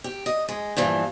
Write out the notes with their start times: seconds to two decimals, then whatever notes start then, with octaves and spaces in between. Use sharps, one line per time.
0.04 G4
0.26 D#5
0.49 G#3
0.77 G2 A#2 E3 F3